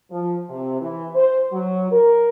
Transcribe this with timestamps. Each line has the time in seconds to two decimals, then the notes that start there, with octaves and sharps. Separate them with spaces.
0.11 F3
0.49 C3
0.81 E3
1.15 C5
1.52 F#3
1.91 A#4